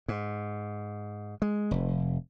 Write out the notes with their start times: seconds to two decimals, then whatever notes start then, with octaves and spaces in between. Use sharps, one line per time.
0.08 G#2
1.42 G#3
1.71 F1